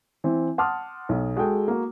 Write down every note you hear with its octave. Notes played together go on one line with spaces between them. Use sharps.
E3 C4
F#5 A5 C6 D6 D#6 F6
B1
G#3 F#4 G#4 A4 G5
A#3 F#4